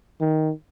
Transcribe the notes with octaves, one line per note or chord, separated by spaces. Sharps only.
D#3